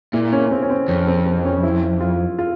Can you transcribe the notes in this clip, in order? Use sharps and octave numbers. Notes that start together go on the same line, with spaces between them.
A#2 E4
C#4
C#4
C4
C#4
C4
F2 C#4
C4
C4
C#4
E4
F4
F4